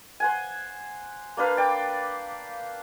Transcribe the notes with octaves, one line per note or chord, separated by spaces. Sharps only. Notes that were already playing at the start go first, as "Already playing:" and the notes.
C5 F#5 G#5
A#3 D4 B4 F5
D5 G5 D6